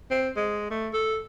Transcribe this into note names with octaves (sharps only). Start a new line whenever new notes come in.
C4
G#3
A3
A4